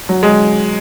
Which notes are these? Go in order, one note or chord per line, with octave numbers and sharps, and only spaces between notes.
F#3
G#3